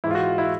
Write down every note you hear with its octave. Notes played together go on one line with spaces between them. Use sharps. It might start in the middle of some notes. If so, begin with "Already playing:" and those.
G#2 E3 E4
F4
F#4
E4